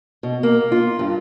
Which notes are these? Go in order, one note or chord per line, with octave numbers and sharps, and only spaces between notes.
B2
A#3
F4
G2